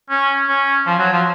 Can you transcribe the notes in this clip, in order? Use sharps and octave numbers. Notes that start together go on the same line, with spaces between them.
C#4
C#4
F3
F#3
F3